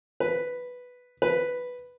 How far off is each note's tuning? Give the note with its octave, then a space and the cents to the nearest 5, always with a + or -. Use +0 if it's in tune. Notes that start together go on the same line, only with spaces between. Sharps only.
B4 +0
B4 +0